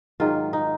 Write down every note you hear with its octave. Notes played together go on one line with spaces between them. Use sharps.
G#2 D#3 F#3 F4
D#4